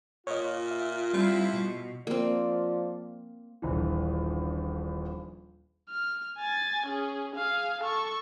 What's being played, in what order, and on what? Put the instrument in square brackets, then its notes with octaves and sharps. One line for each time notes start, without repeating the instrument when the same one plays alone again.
[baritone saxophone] A#2 [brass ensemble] F4 [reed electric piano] C#5 D#5
[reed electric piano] E5
[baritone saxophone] F3 [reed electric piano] G3 [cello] C4 E4
[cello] B2
[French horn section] F3 D5 [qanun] A#3 C4
[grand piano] D#1 A#1 E3
[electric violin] F6
G#5 A6
C#4 G#4
G#4 F5
A4 C#6